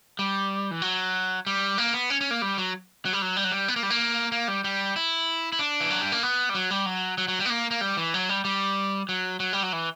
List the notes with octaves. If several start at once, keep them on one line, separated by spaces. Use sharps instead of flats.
G3
E3
F#3
G3
A#3
B3
C#4
C#4
A#3
G3
F#3
F#3
G3
F#3
G3
F#3
G3
B3
A#3
G3
A#3
A#3
G3
G3
E4
E4
D4
E3
F#3
G3
A#3
B3
G3
F#3
G3
F#3
F#3
F#3
G3
B3
A#3
A#3
G3
E3
F#3
G3
G3
F#3
F#3
G3
F#3
E3